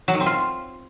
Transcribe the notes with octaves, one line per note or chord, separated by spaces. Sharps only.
F#3
D#3
C4
F4